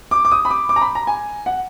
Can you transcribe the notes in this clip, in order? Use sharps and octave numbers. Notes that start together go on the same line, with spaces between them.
D6
D6
D#6
B5
D6
D6
A#5
B5
A#5
G#5
F#5